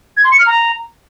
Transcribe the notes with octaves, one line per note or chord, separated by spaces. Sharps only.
G#6
C6
C#7
F6
A#5